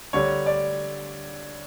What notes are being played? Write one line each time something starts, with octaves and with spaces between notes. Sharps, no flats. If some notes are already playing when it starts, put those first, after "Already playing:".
D3 G3 C#5
D5